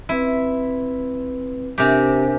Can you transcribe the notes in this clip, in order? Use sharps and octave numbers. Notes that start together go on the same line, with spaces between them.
C4 E4 B4
C3 D4 G4 A#4 G#5